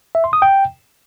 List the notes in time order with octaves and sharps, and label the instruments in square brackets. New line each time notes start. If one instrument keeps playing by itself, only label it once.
[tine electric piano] E5
C6
D#6
G5